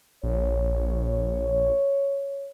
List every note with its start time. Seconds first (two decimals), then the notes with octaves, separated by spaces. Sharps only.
0.23 A#1 C#5